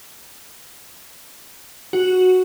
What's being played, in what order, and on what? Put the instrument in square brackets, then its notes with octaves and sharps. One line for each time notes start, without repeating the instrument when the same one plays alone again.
[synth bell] F#4